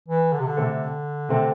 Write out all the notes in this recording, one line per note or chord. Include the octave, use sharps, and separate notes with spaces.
E3
D3
C3
D3
C3 A3 C4 A4
C3 A3 C4 A4